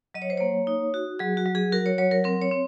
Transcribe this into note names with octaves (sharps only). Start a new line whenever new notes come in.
F#3 D#5
C#5
C5
A#3 C#5
D#4
F#4
F#3 G#4
F#4
F#3
G#4
F#4 A#4
C#5
F#3 C#5
A#4
C4 A#4
C#5
C4